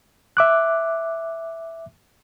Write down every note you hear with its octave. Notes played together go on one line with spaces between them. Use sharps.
E5 D6 F#6